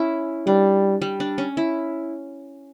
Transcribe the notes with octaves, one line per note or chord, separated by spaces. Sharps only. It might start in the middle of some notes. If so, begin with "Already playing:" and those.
Already playing: C#4 E4
G3 D4
G3
D4
C#4
E4